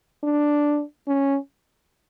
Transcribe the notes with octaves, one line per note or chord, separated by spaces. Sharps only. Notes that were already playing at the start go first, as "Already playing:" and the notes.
D4
C#4